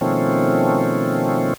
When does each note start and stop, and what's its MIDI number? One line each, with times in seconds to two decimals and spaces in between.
0.01 1.54 47
0.01 1.54 51
0.01 1.54 53
0.01 1.54 57
0.01 1.54 60
0.01 1.54 61